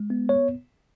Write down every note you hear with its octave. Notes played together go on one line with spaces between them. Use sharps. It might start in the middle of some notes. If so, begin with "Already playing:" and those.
Already playing: G#3
B3
C#5